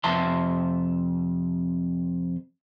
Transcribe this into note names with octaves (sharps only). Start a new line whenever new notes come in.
F2 C3 E5 A5 C6